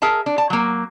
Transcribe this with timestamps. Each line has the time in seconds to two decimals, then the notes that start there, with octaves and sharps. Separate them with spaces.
0.02 G#4 A#4 E5 A5
0.26 D4
0.38 A5
0.50 F#3 A#3